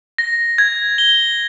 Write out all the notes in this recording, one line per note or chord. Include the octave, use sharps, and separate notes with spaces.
A#6
G#6
G7